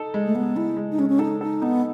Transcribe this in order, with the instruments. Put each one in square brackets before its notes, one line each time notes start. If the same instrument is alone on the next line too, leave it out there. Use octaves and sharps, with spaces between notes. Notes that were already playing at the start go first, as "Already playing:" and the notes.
Already playing: [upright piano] D#4 A4
G#3
[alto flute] A3
[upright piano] G#3 [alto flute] B3
[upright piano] G#3 [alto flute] E4
[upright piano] G#3
[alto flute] D#4
[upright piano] G#3 [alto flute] C#4
[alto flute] C#4
[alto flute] D#4 [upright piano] A4
[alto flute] D#4 [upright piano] A4
[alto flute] B3 [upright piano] D#4